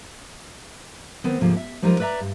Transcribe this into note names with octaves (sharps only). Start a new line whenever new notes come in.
D#3 B3 C4
D2 G#2 C3 F3 A#3
E5
F3 G3 G#3 D#4 F4 A#4
B4 D5 E5 A#5
G2